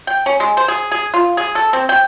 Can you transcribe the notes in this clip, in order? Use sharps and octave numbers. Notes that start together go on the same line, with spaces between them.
G5
C#4
G#3
C5
G#4
G#4
F4
G#4
A4
C4
G5